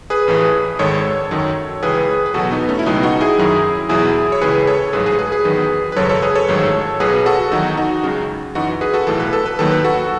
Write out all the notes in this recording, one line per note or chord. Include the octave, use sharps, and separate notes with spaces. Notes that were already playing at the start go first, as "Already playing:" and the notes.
G#4 B4
A1 A2 E3
G#1 G#2 D#3 A4 C#5
F#2 D#3 F#3
C#2 C#3 E3 G#4 B4
B4
E2 B2 F#3 F#4 A4
B3 D#4
A3 C#4
E4
C#2 B2 F#3 B3 D#4
D#4 F#4
E4 G#4
F#2 D#3 F#3
E2 B2 F#3 E4 G#4
C#5
C#2 C#3 E3 G#4 B4
A4 C#5
A1 G#2 F#3 G#4 B4
G#4 B4
G#4 B4
G#4 B4
E2 D#3 F#3
B4
G#1 F#2 C#3 F#3 A4 C#5
A4 C#5
G#4 B4
A4 C#5
A1 G#2 D#3 F#3
B1 B2 F#3 G#4 B4
F#4 A4
E2 D#3 F#3 D#4 F#4
D#4 F#4
C#2 C#3 F#3
F#2 E3 D#4 F#4
G#4 B4
F#4 A4
B1 A2 E3 A4
B4
A4
B4
D#2 D#3 F#3 A4
B4
F#4 A4